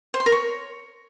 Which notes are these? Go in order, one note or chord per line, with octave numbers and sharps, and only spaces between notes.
C5
C6
A#4
C#5